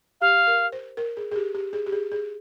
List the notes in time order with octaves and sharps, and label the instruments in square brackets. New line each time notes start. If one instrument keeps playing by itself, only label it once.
[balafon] G4 [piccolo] F5
[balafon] A#4
C5
A#4
G#4
G#4
G4
G4
G#4
G4
G#4
G#4